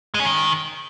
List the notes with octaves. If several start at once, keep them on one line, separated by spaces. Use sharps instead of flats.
G#3
C#4
D#3